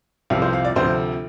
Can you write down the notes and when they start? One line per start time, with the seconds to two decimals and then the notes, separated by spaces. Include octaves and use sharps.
0.30 C2 C3 F3 F5
0.42 C5
0.53 F5
0.65 D5
0.76 D2 C3 F3 C5